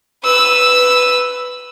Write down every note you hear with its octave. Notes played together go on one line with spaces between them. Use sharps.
B4 E6